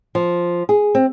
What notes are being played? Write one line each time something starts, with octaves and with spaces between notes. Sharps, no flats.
F3
G#4
C4